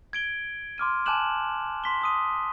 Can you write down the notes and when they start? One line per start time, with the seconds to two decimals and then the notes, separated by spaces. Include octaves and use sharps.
0.13 G#6 D7 G7
0.78 C6 D6 F6 D#7
1.06 G#5 A5 D6 F#6 E7 F#7
1.84 C6 B6 G7
2.02 C6 D#6 D#7